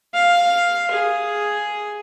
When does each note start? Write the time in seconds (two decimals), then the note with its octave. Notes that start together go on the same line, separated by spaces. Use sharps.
0.14 F5
0.92 G#4